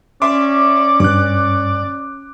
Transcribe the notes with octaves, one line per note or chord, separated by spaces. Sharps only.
C#4 D5 E5 C6 D6
G2 D6 F#6